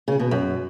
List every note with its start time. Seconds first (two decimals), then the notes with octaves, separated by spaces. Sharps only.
0.08 C#3
0.19 B2
0.31 F#2